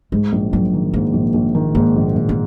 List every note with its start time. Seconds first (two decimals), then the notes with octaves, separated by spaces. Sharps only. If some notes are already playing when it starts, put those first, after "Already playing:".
0.12 G#2 G#3
0.32 A#1
0.52 A#1 F#3
0.74 D#3
0.94 G#2 A#3
1.13 A#1
1.34 A#1
1.55 D#3
1.75 G#2 A#3
1.96 A#1
2.16 A#1
2.29 A#3